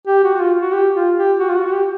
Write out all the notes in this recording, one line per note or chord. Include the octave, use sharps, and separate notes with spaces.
G4
F#4
F#4
F4
F#4
G4
F4
G4
F#4
F4
F#4
F#4
G4